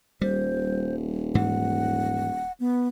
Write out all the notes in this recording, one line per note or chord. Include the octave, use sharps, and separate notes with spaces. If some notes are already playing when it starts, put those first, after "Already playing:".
D#1 G3 C5
G#2 E3 F#5
B3